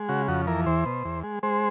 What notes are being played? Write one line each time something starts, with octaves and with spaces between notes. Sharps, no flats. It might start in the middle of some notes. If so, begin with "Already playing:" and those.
Already playing: G#3
C#3 F#4
F2 F#4
E3 A#4
E2 C5
B2
E2
G#3
G#3 C5